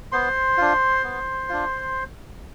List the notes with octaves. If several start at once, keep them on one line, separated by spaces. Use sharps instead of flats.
B3 C5 C6
D4 F4
B3
D4 F4